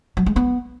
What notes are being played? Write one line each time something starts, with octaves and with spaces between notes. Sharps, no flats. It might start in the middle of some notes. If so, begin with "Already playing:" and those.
F#3
G#3
B3